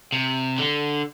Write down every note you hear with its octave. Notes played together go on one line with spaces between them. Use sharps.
C3
D3